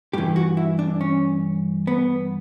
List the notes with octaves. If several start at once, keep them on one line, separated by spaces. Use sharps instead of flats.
G2 E3 G4
F#4
E4
D4
C#4
B3